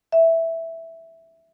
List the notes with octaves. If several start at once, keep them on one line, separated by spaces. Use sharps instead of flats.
E5